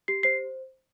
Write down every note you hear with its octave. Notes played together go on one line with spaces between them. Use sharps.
G4 C7
C5 C7